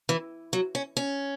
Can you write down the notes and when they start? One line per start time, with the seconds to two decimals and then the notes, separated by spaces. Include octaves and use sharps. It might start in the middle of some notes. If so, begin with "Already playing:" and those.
0.09 E3
0.53 F#3
0.75 C#4
0.97 C#4